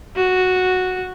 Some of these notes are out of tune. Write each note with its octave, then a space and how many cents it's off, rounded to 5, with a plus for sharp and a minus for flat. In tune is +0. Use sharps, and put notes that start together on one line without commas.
F#4 -5